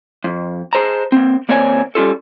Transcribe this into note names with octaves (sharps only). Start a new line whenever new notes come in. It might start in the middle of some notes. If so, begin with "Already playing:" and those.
F2
G#4 C5 A5 A#5
A#3 C4
D#2 A#3 C4 C#5 D5 G#5
G3 C#4 F4 A4